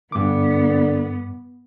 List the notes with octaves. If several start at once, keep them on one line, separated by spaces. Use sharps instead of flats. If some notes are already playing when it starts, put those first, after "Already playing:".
G2 D3 B3 D6